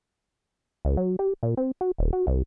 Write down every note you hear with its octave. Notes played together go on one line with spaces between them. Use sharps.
C#2
F#3
G4
A#2
C4
F#4
D#1
F#4
C2